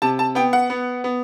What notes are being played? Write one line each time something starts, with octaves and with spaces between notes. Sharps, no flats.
C3 A5
A5
B3 G5
F#5
B3
B3